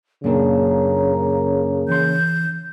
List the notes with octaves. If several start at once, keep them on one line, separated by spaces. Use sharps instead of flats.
F#2 A#2 C#3 A#3 D4
E3 C6 G6